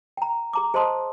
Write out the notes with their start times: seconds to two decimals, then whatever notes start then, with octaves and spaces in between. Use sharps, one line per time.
0.17 G5 A#5
0.53 G#4 A#5 D6
0.74 G#4 C5 D#5 A5 C6 D#6